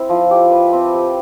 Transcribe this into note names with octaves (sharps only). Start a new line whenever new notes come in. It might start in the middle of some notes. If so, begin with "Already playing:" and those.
Already playing: C4 E4 G#4
F3
G4
B4
C4
G4